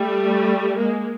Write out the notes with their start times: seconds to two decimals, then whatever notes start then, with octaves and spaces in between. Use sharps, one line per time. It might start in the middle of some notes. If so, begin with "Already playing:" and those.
Already playing: G3 A3
0.76 G#3 A#3